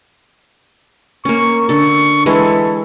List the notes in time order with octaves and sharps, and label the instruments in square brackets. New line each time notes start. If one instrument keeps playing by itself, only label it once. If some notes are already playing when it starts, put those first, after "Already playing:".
[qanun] A#3 C#4 [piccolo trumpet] C#6
[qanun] D3 A4 [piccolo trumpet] C#6
[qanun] E3 G#3 E4 [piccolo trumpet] A4